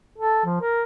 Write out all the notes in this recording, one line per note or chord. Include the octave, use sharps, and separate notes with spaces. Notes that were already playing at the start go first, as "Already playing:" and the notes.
A4
F3
A#4